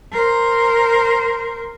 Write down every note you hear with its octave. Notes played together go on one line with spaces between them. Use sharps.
A#4 C5